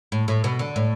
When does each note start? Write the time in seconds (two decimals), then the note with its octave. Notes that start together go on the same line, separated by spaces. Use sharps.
0.12 A2
0.28 A2
0.44 B2
0.59 D3
0.76 A2